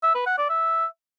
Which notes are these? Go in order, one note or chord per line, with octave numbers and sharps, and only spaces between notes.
E5
B4
F#5
D5
E5